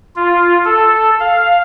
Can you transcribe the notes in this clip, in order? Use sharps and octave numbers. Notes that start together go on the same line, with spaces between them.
F4
A4
F5